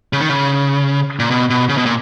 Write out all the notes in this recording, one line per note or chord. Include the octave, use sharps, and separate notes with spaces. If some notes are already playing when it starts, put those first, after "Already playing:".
C#3
D#3
C#3
A#2
B2
B2
C#3
B2
A#2